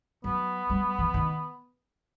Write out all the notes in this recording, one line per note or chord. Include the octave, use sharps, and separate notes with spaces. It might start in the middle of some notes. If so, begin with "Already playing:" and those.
F#3 B3
G3
E3
D#3